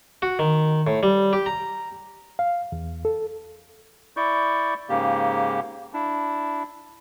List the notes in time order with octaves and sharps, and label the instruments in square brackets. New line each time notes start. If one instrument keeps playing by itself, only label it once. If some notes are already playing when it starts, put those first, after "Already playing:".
[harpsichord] F#4
D#3
A2
G3
G4
A#5
[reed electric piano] F5
E2
A4
[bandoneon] E4 D5 C#6 G6
G#2 C#3 A#3 G4
D4 E4